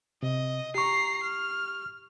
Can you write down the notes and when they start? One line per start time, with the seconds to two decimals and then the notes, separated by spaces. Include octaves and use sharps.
0.23 C3 D#5
0.75 G4 A#5 C#6 C7
1.23 F6